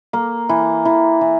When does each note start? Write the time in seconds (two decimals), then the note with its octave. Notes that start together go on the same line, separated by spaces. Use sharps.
0.13 A#3
0.49 E3
0.85 E3
1.21 E3